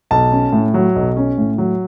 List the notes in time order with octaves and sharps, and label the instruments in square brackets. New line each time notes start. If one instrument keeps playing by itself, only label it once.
[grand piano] B1 A5
C#4
A2
F#3
B1
C#4
A2
F#3